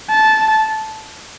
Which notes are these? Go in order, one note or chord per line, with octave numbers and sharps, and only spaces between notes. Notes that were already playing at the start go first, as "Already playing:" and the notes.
A5